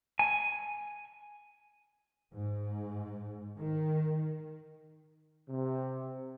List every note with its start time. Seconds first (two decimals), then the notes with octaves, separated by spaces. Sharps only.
0.19 G#5
2.34 G#2
3.59 D#3
5.48 C3